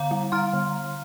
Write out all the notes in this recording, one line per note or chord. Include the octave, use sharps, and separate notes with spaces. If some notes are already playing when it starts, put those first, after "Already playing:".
Already playing: D3 F5 A#5
G3
G3 C6 F6
D3